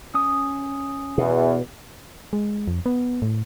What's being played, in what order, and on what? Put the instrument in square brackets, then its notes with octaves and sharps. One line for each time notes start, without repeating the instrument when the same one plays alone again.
[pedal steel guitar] C#4 D#6
[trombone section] E2 [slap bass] B2
[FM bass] G#3
F2
B3
A2